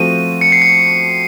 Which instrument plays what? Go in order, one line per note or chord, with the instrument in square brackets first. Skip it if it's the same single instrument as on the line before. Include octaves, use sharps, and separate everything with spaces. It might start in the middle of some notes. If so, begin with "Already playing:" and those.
Already playing: [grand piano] F3 A3 C4 F#4 [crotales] D#7
[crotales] C#7
C7
C#7